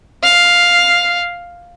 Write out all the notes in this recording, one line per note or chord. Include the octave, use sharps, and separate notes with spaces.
F5